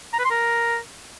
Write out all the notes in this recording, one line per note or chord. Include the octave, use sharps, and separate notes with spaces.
A#5
B4
C6
A#4